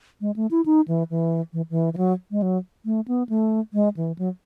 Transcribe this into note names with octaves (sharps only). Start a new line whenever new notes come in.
G#3
A3
E4
D#4
E3
E3
E3
E3
E3
F#3
G#3
F#3
A3
B3
A3
G#3
E3
F#3